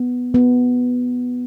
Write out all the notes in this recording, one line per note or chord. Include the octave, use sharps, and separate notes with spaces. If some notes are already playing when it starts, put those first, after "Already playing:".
Already playing: B3
B3